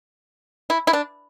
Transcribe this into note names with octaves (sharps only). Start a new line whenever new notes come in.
E4
E4
D4